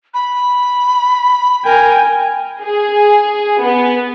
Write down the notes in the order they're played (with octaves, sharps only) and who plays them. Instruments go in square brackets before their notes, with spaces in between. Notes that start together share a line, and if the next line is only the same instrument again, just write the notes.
[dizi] B5
[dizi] A#4 [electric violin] G5 G#5
[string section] G#4
B3